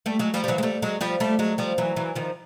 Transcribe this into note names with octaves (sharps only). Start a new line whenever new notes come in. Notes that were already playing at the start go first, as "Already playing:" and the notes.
G3 A3
F#3 G#3
F3 G3
G3
E3 F#3
G#3
G3 A3
F#3 G#3
F3 G3
G3 A3
F#3 G#3
F3 G3
E3 F#3
E3 F#3
D#3 F3